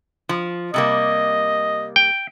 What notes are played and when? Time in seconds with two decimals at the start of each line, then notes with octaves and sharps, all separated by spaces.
0.29 F3
0.74 C3 G3 A#3 D#5
1.96 G5